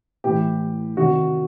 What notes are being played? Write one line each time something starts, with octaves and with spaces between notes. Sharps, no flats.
A2 E3 G4
C3 D#3 F#4